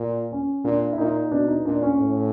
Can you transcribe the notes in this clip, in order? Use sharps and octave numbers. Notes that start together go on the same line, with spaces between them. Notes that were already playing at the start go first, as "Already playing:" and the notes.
Already playing: A#2
C#4
A#2 D4
E4
A#2 D#4
B2 D4
D#4
A#2 D4
C#4
A2